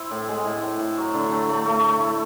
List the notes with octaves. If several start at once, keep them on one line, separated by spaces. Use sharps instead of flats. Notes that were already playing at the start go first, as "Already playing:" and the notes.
Already playing: C4 E4
A2
G#3
A2
A2
A2
F#3
D3
A3
A3
A3
A3
E4